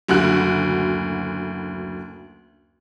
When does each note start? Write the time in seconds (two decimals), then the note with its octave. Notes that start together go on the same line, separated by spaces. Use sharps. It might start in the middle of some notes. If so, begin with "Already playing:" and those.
0.09 F#1 D2 F#4 F#6